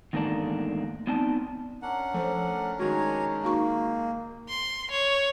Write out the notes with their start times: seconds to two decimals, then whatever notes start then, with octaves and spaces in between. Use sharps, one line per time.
0.13 E2 G#2 D#3 A3 A#3 D4
1.07 B3 C4 D#4 D5 A5
1.82 C#4 D4 A#4 F#5
2.14 F3 A3 C5
2.80 D#3 G#3 F#4 C#5 G#5 A#5
3.43 A#3 D#4 F#4 C#6
4.49 C6
4.91 C#5